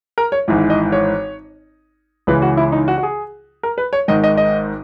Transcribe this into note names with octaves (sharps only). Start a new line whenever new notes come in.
A#4
C#5
G#1 G#2 E3
D#5
C#5
C#2 C#3 E3 B4
F#4
E4
D#4
F#4
F#4
G#4
A#4
B4
C#5
G#1 G#2 D#3 D#5
D#5
D#5